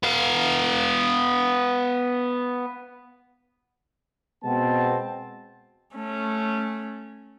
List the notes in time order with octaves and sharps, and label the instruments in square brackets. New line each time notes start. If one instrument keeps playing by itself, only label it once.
[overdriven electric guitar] B3 F5
[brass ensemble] B2 G#3 B3 C4 A5
[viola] A3 C#4